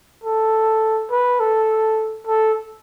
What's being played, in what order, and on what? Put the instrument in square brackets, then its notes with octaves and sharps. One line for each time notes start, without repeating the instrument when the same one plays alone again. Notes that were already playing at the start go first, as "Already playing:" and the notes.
[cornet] A4
B4
A4
A4